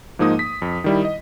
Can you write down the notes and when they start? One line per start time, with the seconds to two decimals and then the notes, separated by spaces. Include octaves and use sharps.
0.19 G#2 F3 A#3 D#4 D#6
0.39 B6
0.62 F2
0.84 D#3 G3 E4
1.05 D#5